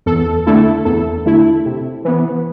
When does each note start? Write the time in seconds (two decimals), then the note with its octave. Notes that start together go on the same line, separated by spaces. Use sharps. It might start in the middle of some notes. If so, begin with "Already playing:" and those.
0.06 E2 A4
0.47 D3 A3 E4 A4
0.85 E2 A4
1.26 D3 A3 E4
1.66 C3
2.05 E3 B3